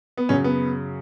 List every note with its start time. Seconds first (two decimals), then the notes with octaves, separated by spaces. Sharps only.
0.17 B3
0.29 F#2 C#3 F#3 C#4
0.44 B3